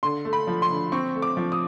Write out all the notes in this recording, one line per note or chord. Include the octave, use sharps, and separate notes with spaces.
D3 C6
A3
B5
F3
C6
D3
C4 C#6
A3
D6
F3
D#6